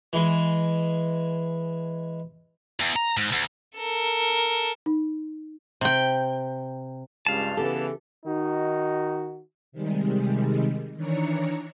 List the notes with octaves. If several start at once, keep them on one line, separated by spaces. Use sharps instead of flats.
E3 G#3
E2
A#5
G#2
D2
A4 A#4
D#4
C3 G5
C#2 G2 F5 A5
C#3 E3 B3 G4 A4
D#3 D#4 F#4
C3 D#3 G3 G#3
D#3 E3 D4 C#5 A#5 C#7